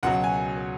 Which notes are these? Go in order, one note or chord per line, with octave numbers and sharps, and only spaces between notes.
C#2 B2 F#3 F#5
G#5